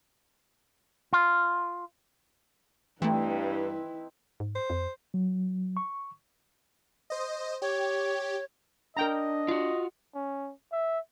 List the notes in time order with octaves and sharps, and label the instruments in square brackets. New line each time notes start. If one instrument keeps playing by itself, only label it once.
[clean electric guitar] F4
[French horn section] G2 [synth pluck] E3 A3 [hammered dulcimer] C4 D#4 [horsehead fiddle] E4 B4
[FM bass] G#2
[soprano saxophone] C5
[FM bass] F2
[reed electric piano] F#3
C#6
[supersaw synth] C5 D#5
[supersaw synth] G4 [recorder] C#5
[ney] D4 [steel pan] A#4 G5 A#5 [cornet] D#5
[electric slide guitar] F4 F#4
[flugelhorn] C#4
E5